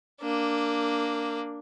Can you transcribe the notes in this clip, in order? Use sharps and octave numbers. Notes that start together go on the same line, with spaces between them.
A#3 D4